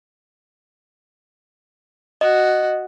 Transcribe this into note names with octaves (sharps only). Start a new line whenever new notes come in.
F#4 D#5